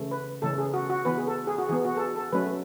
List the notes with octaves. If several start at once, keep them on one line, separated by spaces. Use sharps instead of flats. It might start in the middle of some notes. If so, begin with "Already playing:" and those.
Already playing: C#3 E3 A3 C#4
B4
C#3 E3 A3 C#4 A4
G#4
F#4
F#4
E3 B3 B4
G#4
A4
G#4
F#4
E3 B3 G#4
F#4
A4
G#4
A4
F#3 A3 C#4 B4